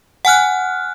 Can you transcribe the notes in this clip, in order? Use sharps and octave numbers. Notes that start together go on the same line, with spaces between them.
F#5 G#5 F6 F#6